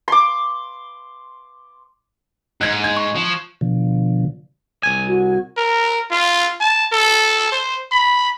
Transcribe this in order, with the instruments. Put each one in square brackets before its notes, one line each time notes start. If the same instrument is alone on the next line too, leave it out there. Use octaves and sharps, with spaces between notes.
[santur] C6 D6
[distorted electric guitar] G#2 [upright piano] F#6 G#6
[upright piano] G#6
[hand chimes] C#6
[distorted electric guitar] F3
[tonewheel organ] B2 D3 F3
[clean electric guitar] C2 G#5
[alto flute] F#4
[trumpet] A#4
F4
A5
A4
C5
B5